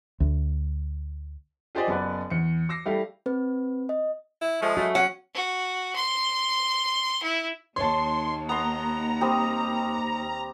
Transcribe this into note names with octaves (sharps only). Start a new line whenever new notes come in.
D2
F4 G4 G#4 C5 D5 D#5
F#1 B3 B4 D5
E2 C#7
D6 E6 A#6 C7
G3 A3 E4 G4 F5
C4 B4
D#5
E4
F3 G#3 A3
C#3 A3 F#4
C#4 F#5
F#4
C6
E4
D#2 A#3 C#5 A5 C6
B3 A#5 C6
G3 C4 D#6